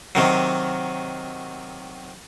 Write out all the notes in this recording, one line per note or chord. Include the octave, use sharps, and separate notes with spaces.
C3 D#3 F#3